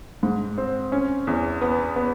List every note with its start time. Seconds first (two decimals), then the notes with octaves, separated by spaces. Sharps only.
0.23 G#2
0.58 C4
0.92 C#4
1.27 E2
1.61 B3
1.96 B3